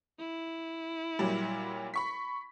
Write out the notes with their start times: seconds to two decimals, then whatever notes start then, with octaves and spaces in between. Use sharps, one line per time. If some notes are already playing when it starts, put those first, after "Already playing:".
0.19 E4
1.19 A#2 F#3 G3
1.94 B5 C#6 B6